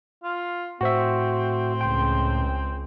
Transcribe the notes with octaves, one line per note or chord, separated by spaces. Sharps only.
F4
A2 C4 F#4 C5 E5
C#2 G5 C6